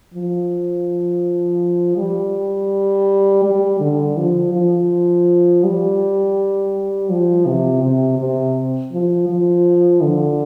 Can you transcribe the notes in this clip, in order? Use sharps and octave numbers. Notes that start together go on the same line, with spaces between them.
F3
G3
G3
D3
F3
F3
G3
F3
C3
C3
C3
F3
F3
D3